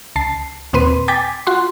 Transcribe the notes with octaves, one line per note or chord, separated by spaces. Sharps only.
C#2 A5 C7
D#2 A#2 C4 B4 C6 D#7
G5 G#5 D6 A6 B6
F4 F#4 C6